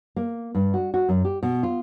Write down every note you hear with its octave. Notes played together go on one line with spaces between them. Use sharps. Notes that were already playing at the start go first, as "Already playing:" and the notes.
A#3
G2
F#4
F#4
F#2
G4
B2
F4